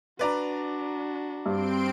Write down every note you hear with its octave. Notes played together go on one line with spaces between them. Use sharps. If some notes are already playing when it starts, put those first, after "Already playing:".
D4 F#4 B4 D5 A#5
G2 C4 C6 D7